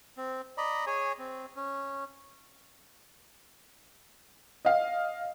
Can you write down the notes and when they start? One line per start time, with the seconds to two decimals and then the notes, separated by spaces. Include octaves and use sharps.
0.17 C4
0.58 D5 D#5 A#5 B5
0.87 G#4 C#5 G#5
1.19 C4
1.56 C#4
4.65 D#5 F5